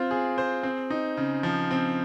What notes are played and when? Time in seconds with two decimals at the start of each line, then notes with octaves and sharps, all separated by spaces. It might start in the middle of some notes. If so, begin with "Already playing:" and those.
Already playing: C4 F4 C5
0.11 G#4
0.38 C5
0.63 C4
0.90 D#4
1.17 C#3
1.43 F3
1.71 C4